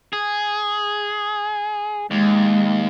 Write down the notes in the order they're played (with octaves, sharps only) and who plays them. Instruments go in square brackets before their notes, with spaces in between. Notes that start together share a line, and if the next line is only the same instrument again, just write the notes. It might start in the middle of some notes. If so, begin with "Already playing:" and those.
[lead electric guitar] G#4
[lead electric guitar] D#2 [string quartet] G#3